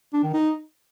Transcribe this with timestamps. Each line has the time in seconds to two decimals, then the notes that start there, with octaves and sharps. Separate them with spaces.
0.13 D4
0.23 D#3
0.33 D#4